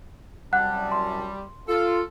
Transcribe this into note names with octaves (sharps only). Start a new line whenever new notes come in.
C2 F#2 G3 F#5 A5 F#6
C6
F4 A4